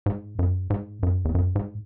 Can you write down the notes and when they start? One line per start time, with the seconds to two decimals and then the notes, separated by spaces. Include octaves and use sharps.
0.06 G#2
0.39 F#2
0.70 G#2
1.03 F#2
1.25 E2
1.35 F#2
1.55 G#2